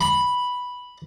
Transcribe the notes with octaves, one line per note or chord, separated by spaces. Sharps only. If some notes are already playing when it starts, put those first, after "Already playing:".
B5